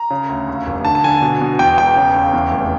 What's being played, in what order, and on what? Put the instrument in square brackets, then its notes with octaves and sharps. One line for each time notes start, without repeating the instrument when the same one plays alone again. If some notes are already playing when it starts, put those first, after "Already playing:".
Already playing: [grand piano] A#5
C#3
D2
D#2
F1
D3 A5
A5
D3 G#5
B2
B2
E2 G5
E1 G5
C#3
D#2
E2
F1